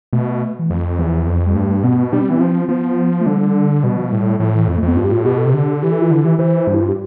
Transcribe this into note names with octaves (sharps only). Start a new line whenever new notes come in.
B2 A3
E3
F2 F3
E2 F3
F2
G3
G2 A3
B2 B3
G3 D4
C4
E3 B3
F3 C4
F3 B3
A3
D3 G3
B2 G3
F3
A2 G3
A2 F3
E3
F2
A3
F2 B3
G2 F4
G4
A2 F4
B2 G4
A4
C3
D3 G4
E3 G4
A4
F4
D3 E4
E3 G4
E3 C5
G2
E4
F4
G4